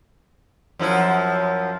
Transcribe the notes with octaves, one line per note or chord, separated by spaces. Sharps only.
F#2 F3 E4